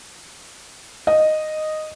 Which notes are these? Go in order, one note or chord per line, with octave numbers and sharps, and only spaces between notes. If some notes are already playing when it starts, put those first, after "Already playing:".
D#5